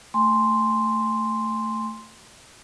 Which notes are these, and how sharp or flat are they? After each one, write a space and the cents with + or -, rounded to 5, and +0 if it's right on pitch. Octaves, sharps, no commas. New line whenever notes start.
A3 +10 G#5 -25 C6 +0